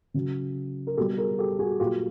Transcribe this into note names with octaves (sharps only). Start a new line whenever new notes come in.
C#3 F#3
A#4
B2 G3 G4 A4
G#4 A#4
G4 A4
F#4 G#4
A#2 F#3 F4 G4